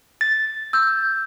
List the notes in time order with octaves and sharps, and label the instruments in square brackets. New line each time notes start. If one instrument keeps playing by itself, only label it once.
[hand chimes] A6
[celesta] E6 G6